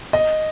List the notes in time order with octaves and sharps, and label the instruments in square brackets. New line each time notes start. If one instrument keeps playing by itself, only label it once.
[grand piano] D#5